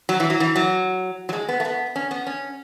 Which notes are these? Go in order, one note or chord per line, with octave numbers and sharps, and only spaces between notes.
F#3
E3
F#3
E3
F#3
F#3
G#3
B3
A3
B3
C#4
B3
C#4